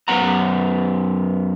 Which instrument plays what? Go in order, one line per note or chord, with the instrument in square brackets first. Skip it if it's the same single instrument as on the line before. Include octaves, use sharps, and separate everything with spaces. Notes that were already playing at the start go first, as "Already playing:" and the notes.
[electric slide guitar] F#2 B3 F#5 A#5